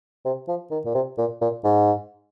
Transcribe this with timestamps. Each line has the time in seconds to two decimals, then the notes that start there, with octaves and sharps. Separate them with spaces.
0.25 C3
0.48 F3
0.71 D#3
0.85 A#2
0.94 C3
1.18 A#2
1.41 A#2
1.64 G#2